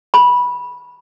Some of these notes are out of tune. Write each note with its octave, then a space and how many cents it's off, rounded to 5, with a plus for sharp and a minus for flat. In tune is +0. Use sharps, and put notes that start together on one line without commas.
B5 -15